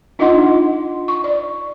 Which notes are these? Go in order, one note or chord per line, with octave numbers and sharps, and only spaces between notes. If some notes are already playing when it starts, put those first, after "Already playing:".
D4 D#4 F4 D#5 F#5 C6
C#6
D5